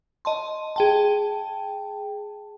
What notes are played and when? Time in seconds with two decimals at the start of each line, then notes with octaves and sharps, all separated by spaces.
0.25 D#5 A5 C6
0.76 G#4 G5 A5